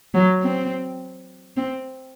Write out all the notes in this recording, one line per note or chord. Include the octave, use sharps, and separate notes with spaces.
F#3
C4
C4